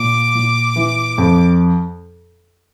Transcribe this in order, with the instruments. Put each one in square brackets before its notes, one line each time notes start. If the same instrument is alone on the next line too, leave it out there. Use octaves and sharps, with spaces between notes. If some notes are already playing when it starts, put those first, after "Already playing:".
Already playing: [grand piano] A#2 [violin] D6
[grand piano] A#2
E3
F2